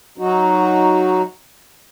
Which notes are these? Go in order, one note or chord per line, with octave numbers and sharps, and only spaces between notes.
F#3 D#4 F#4